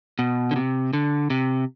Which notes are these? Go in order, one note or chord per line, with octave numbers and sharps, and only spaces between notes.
B2
D3
C3
D3
C3